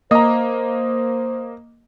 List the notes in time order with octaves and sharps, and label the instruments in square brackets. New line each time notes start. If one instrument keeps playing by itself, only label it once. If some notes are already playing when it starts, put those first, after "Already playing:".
[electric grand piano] A#3 [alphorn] C5 [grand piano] D#5 A#5